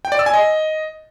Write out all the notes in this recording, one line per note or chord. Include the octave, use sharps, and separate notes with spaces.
G5
D5
E6
G#5
D#5